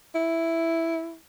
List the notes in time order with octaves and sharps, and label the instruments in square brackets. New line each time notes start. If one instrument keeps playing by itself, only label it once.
[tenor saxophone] E4